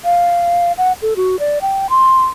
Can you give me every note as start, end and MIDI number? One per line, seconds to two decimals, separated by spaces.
0.05 0.72 77
0.78 0.93 78
1.02 1.14 69
1.16 1.39 66
1.39 1.59 74
1.62 1.87 79
1.90 2.25 84